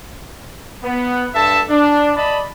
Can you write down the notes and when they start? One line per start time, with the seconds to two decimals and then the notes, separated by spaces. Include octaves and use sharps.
0.84 B3
1.35 G2 A4 E5 A5
1.69 D4
2.16 D5 D#5 A5 B5